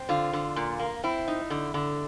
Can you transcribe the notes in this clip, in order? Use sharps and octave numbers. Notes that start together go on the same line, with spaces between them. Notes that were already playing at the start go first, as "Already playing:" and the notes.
Already playing: C4
D3 F4
D3
A#2
A#3
C4 E4
D#4
D3
D3